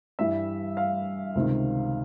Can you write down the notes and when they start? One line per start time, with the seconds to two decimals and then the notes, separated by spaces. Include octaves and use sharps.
0.19 G2 E3 G3 E5
0.77 F5
1.35 C#2 C3 D#3